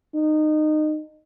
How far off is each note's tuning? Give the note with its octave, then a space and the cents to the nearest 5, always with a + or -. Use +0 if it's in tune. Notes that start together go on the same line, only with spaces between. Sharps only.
D#4 -20